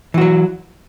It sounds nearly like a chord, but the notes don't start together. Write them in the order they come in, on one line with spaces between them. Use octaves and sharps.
E3 F#4 F#3